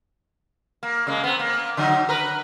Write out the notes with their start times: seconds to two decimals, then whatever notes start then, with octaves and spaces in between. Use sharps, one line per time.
0.83 A#3
1.07 C#3 G#3 A#3
1.24 B3 C4
1.39 A#3
1.77 D3 F#3 D#4
2.09 A#4 B4